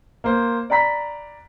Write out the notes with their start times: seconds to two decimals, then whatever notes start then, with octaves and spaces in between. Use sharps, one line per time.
0.24 A#3 C5
0.70 D5 F#5 A#5 B5 B6